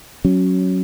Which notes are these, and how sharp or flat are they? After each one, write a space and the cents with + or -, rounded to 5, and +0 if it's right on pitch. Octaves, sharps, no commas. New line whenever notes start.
F#3 +5 C#4 +0